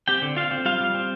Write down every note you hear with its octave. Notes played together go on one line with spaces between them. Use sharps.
C4 G4 G5
D3
C4 F4 F5
C4
G3 F4 F5
G3
C4